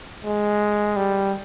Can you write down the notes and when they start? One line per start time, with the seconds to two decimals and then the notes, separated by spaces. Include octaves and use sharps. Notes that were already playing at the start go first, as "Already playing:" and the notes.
0.25 G#3
0.96 G3